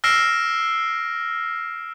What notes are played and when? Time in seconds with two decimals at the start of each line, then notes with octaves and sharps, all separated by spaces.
0.04 E6 F6 A#6 C7 D7 E7